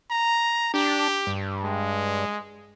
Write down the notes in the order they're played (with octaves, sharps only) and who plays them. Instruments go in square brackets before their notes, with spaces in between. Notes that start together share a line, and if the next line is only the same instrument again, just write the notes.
[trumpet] A#5
[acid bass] D4 [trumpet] G4
[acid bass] G2
[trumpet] G#3